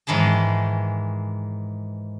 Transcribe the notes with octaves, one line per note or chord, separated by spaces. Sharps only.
G#2 D#3 E3 G#4 A5